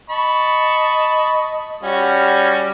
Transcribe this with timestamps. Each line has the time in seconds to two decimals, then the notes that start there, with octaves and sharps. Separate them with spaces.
0.10 D#5 A5 B5 C#6
1.83 G3 C#4 F#4